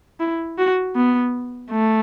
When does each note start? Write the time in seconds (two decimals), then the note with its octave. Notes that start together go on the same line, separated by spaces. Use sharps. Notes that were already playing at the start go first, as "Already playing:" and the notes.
0.20 E4
0.58 F#4
0.96 B3
1.71 A3